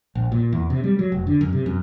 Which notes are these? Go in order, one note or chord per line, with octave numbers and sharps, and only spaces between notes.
A#1
A#2
E2
C3
G3
F#3
F1
D3
F#2
C3
F#2